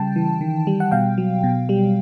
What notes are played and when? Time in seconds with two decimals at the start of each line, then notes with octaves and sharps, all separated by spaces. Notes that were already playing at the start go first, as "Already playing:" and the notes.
Already playing: C#3 G3 G5 A5
0.16 E3
0.41 D#3
0.67 G3
0.80 F#5
0.91 B2 F5 G5
1.18 F#3
1.44 B2
1.69 G3